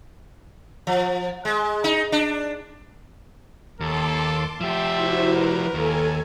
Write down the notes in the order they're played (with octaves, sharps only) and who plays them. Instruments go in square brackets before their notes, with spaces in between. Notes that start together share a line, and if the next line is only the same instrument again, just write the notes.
[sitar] F3
G#3
D#4
D4
[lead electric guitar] D#2 [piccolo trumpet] A4 [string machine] A5 C6 D6
[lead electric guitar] F3 G4 [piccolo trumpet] E5 [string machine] G5 A5 C6
[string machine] E4 F#4 C5
[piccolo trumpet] A#4 [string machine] B4
[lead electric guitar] D#2 [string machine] A4 G#5